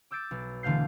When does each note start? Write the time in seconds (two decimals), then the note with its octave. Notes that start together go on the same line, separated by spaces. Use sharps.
0.11 D6 E6 G6 A6 D7
0.31 B1
0.63 E1 D3 A3 F5 G6 C7